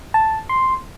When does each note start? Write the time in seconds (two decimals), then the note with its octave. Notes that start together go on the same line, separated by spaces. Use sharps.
0.14 A5
0.49 C6